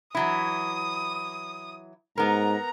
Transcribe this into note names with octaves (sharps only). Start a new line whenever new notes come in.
E3 F#3 E4 D#6
G#2 B3 A#4 A#5